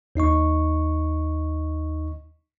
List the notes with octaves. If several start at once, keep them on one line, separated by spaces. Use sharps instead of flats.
D#2 D#4 D#5 C#6